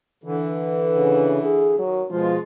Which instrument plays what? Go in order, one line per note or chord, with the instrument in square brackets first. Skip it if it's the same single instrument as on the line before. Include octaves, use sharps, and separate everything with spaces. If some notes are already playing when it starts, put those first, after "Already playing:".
[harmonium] D3 E3
[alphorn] C#3
G#4
[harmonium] D#3 [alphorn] F#3
[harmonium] B2 G#3 F4 [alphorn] F3